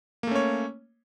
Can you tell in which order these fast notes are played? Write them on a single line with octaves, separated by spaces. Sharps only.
A#3 A3 C#4 C#5